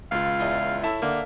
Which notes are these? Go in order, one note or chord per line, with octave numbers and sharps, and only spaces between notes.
C#2 F4 F5
E2 D#5
A2 E4 E5 A5
D3 A#3